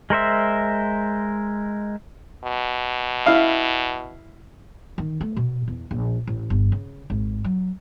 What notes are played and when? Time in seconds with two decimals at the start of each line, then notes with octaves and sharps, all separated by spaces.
0.10 G#3 A#4 C5 E5
2.44 B2
3.26 E4 F5
4.98 D#3
5.21 A3
5.36 B2
5.68 E2
5.91 A#1
6.27 A1
6.50 G1
6.72 C#3
7.10 G#1
7.44 F#3